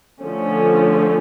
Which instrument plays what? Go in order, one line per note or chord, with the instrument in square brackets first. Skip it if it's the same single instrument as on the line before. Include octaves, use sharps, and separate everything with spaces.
[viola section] D3 F3 A3 C#4